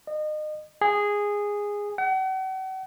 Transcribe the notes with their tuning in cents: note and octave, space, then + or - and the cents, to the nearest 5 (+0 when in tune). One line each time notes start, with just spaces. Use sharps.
D#5 -30
G#4 -10
F#5 +40